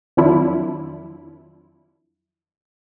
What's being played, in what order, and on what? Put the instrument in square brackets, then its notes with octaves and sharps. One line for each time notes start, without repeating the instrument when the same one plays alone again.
[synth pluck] F2 D#3 F#3 D4 E4 F4